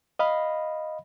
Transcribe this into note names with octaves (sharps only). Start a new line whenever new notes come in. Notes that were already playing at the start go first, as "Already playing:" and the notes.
D#5 F5 B5